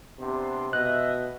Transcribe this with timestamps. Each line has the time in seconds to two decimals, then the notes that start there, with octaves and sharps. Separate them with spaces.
0.19 C3 B3 D4 C6
0.73 B2 D#5 E5 F#6